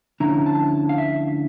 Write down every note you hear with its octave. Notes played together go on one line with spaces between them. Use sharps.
D2 D3 F3 C#4 E4 A#5
A5
F5
E5